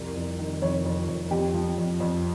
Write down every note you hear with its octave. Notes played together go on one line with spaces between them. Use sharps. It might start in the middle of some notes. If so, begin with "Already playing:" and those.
Already playing: C2 F2 A#4
F2
D#3
F2 C#5
F2
F2
F2 G4
F3
F2
F2